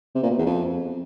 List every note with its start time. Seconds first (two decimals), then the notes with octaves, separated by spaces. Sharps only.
0.15 C3
0.23 A#2
0.30 B2
0.38 E2
0.46 F2